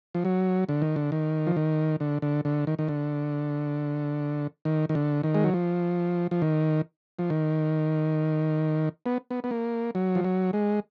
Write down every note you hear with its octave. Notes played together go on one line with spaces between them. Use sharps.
F3
F#3
D3
D#3
D3
D#3
F3
D#3
D3
D3
D3
D#3
D#3
D3
D#3
D#3
D3
D#3
G#3
F#3
F3
F3
D#3
F3
D#3
B3
B3
B3
A#3
F#3
F3
F#3
G#3